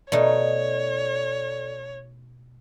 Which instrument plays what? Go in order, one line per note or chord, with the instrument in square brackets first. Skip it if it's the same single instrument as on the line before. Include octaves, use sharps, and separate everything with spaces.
[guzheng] B2 A3 D#4 [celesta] A4 D5 [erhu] C#5